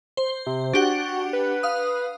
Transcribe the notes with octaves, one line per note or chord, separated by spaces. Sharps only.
C5
C3
D4 F#4 G4 F#5
B4
F5 D#6